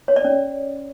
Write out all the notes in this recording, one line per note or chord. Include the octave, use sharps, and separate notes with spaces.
C#5
D5
C#4